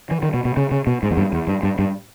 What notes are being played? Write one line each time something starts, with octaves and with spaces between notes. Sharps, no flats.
E3
D#3
B2
B2
C#3
C#3
B2
G#2
E2
G2
E2
G2
G2
G2